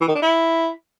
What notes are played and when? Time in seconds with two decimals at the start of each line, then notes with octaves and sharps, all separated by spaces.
0.01 E3
0.08 D#3
0.15 D4
0.22 E4